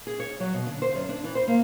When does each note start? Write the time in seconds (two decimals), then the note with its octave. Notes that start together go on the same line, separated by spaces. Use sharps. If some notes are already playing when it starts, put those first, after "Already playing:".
0.07 G#4
0.20 C#5
0.40 F#3
0.54 B2
0.67 D3
0.82 C5
0.95 F#2
1.09 D4
1.24 E3
1.35 C5
1.48 A#3